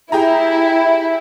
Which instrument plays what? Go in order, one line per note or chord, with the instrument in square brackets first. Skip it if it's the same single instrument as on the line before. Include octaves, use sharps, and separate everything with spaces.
[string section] E4 [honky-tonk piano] G4 G#4 A#5